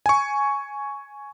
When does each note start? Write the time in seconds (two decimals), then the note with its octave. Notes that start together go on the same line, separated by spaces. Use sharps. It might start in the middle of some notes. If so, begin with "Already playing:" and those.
0.06 G#5 C#6